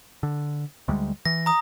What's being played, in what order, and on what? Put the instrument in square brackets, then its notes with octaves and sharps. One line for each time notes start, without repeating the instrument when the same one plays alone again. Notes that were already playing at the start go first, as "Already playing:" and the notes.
[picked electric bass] D3
D2 G3 G#3
[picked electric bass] E3 [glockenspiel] A#6
[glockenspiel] A#5 D#6